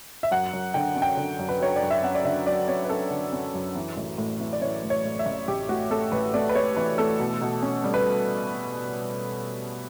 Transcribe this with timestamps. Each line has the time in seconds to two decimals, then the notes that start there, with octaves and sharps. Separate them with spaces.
0.23 E5
0.31 F#2 F#5
0.53 F#2
0.74 D3 G5
0.96 C#4
1.02 G5
1.17 D3
1.39 F#2
1.49 B4
1.61 F#3 C#5
1.76 D5
1.82 F#2
1.90 E5
2.03 C#4 F#5
2.15 D5
2.25 D3 E5
2.46 F#3 D5
2.68 C#4 C#5
2.84 B4
2.89 C#4 A4
3.11 D3
3.33 C#4
3.54 F#2
3.75 E3
3.97 A1
4.18 A2
4.40 E3
4.53 D5
4.62 E3 C#5
4.83 A2
4.90 C#5
5.05 A2
5.19 E5
5.26 A1
5.48 A1 G4
5.69 A2 F#4
5.90 A3 A4
6.12 A1 B4
6.34 A3 D5
6.49 B4
6.55 A3 C#5
6.77 E3 B4
6.98 A3 A4
7.20 B2
7.41 B2
7.62 C#4
7.84 G3
7.94 B4